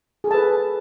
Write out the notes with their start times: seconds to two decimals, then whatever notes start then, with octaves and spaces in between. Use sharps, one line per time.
0.24 G#4
0.27 A4
0.31 A5
0.34 B4